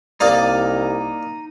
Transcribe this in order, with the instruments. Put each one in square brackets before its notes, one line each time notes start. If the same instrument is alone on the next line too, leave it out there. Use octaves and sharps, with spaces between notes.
[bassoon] C2 [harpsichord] A#3 D5 [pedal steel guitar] D#4 D#6